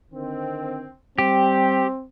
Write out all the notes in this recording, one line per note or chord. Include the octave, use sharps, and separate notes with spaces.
D3 D#3 C4
G3 C4 G4 G5